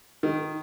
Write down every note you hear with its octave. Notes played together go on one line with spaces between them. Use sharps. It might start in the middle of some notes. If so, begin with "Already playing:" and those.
D#3